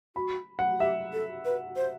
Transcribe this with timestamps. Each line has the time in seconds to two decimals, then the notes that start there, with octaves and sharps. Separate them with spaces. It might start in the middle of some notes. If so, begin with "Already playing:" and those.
0.16 F#4 B5
0.59 F#5
0.80 G4 E5
1.13 A4
1.45 B4
1.76 C5